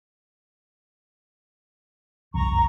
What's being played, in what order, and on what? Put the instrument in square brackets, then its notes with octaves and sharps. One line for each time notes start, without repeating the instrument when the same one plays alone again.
[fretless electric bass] F#1 C2 F2 [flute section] A#5 C#6